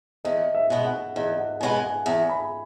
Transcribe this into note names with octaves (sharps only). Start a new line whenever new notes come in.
E2 D#5
E5
B2 G#3 B3
F#5
E2 D#5
F#5
B2 G#3 B3 G#5
G#5
F#5
E2 G#5
B5